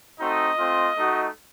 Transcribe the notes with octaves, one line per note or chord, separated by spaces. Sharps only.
A3 C4 D#4 F#4 D#5
A3 C4 F4
A3 D#4 F#4